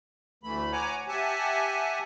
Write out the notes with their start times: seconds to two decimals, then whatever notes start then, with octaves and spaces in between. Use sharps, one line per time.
0.43 D2 E3 A3 B5
0.72 C#5 F#5 G#5 A#5 D6
1.08 G4 E5 F#5 G#5 A5